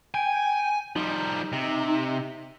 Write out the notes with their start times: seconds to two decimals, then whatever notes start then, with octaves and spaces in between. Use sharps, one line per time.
0.14 G5 G#5
0.96 F3 G3 D#4
1.53 C3